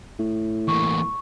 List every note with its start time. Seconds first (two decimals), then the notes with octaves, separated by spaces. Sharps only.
0.19 A2
0.68 E3 A#3 C#6